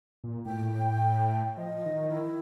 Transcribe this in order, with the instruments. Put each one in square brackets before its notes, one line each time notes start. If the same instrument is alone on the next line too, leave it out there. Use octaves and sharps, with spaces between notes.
[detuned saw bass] A#2
[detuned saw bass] A2 [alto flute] G5
[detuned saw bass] F3 [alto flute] D#5
[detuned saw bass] D#3
[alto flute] E4